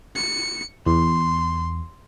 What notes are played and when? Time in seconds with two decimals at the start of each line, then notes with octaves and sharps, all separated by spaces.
0.15 C#7
0.86 E2 C6